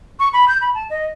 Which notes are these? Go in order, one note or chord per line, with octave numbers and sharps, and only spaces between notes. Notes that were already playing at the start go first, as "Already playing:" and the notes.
C#6
B5
G6
B5
A5
D#5